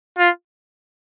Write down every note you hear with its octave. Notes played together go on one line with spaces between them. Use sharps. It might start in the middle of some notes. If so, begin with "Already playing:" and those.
F4